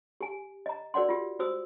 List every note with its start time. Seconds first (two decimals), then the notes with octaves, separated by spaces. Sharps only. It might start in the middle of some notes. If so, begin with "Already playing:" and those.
0.21 G4 G#5
0.66 D#5 A#5
0.94 F#4 A#4 D5 F#5 C6
1.09 F4 G4
1.39 F#4 C5 D#6 E6